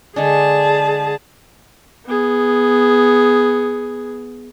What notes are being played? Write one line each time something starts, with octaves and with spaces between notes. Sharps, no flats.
D3 G#3 D4 G#4 A5
B3 G#4